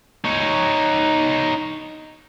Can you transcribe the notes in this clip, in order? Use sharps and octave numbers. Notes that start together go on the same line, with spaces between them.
D#4 C#5